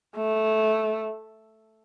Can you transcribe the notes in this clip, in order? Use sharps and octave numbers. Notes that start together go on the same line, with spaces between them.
A3